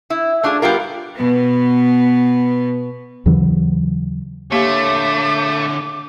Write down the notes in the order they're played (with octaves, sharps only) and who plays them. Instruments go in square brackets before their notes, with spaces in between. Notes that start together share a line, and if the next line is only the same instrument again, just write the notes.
[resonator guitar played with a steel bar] E4
A3 D4 F4 G#4
G3 B3 F4 A#4
[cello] B2 B3
[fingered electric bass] D#2 C#3 E3 F#3
[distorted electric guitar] D3 C#5 [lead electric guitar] A3 [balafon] A#3 G4 F5 [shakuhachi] D6